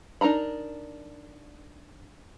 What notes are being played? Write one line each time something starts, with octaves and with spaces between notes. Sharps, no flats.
D4 D#4 A#4 A#5 B5